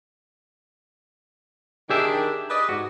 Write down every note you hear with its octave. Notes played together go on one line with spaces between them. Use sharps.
D#3 D4 G4 G#4 E5
B4 D5 D#5
G#2 F#4